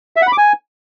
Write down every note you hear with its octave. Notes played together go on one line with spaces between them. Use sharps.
E5
F#5
B5
D6
G#5